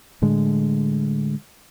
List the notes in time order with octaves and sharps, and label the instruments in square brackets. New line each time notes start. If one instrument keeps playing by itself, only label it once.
[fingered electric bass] A2 D3 G#3